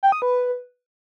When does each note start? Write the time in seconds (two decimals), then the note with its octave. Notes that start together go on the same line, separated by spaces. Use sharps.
0.03 G5
0.12 D#6
0.22 B4